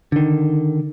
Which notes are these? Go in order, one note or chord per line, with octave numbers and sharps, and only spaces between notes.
D3 D#3